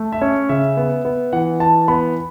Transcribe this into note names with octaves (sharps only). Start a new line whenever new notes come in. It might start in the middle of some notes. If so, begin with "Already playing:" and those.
Already playing: A3
E5
C#4 C#5
C#3 E5
B3
B3
E3 F#5
E3 A5
B3 B5